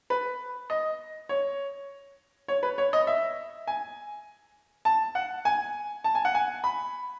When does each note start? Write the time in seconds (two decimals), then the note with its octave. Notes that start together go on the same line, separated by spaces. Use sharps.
0.10 B4
0.70 D#5
1.29 C#5
2.48 C#5
2.63 B4
2.78 C#5
2.93 D#5
3.07 E5
3.67 G#5
4.85 A5
5.15 F#5
5.45 G#5
6.04 A5
6.15 G#5
6.25 F#5
6.35 G#5
6.64 B5